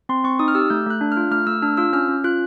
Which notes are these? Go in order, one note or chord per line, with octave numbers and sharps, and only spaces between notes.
C4 C6
C4 C#6
D#4 D#6
F6
G4 E6
A3 G6
A3 F#6
D4
F6
F4
A3 F6
A3 E6
D4 F6
F4 E6
C#4 F6
C#4
F4 F#6